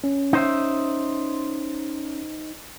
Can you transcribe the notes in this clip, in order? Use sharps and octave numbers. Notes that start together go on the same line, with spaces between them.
C#4
D#4 C5 E5